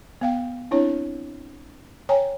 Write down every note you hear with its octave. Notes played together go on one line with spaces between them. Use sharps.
B3 F5 G5
C4 D4 E4 C#5
C#5 G5 G#5 A#5